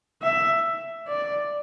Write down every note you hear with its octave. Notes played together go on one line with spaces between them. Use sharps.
E5
D5